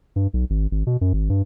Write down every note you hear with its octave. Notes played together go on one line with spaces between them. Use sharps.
G2
B1
G#1
G#1
B2
F#2
G#1
G2